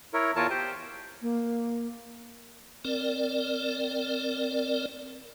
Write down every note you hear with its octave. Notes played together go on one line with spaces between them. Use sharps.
E4 A#4 C#5
E2 E3 F4 A#4 C#5 A5
G4 C5 G5
A#3
C4 A#4 D5